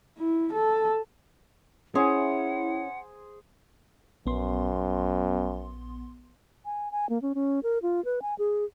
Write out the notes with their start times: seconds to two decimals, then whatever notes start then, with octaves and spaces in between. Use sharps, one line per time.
0.18 E4
0.53 A4
1.95 C#4 E4 G#4 C5 F#5
4.26 A#1 F#2 B3 C6
6.65 G#5
6.92 G#5
7.09 A#3
7.22 C#4
7.35 C#4
7.63 A#4
7.82 F4
8.05 B4
8.22 G#5
8.39 G#4